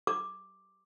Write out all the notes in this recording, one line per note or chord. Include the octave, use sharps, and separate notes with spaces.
D6